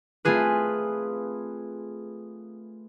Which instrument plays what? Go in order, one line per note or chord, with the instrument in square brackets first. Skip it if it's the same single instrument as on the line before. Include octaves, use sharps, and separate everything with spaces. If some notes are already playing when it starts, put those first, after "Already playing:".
[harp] A3 C4 F4 G#4 B4